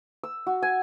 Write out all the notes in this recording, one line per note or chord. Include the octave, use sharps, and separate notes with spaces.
E6
F#4
G#5